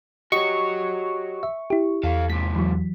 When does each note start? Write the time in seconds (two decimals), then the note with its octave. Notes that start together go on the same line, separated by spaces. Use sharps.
0.32 F#4 G4 C#5 D#5 F#5 C#6
1.43 E5
1.70 E4 G4
2.04 E2 A4 F5
2.30 G#2 C3 B6
2.56 E3 F#3